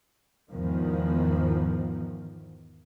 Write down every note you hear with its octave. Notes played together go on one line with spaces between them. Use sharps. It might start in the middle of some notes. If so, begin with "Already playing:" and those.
E2 G#2 D#3 F3